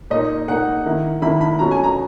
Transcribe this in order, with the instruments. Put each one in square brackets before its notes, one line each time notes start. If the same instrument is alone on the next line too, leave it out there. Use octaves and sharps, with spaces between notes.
[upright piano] A#2 A#3 D#4 D#5
A#2 A#3 D#4 F#5
D#3 A#3 E4
D#3 A#3 E4 B5
B5
B2 F#3 C#4 A#5
G#5
A#5